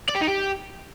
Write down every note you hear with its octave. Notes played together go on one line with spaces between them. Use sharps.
D5
G4
D#4
G4